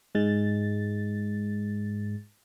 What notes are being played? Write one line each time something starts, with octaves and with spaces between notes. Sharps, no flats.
G#2 G#3 A6